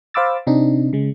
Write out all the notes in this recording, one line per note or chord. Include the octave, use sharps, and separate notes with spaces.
C5 F5 B5 D6 E6 A6
C3 C4 D4 D#4
C#3 G#3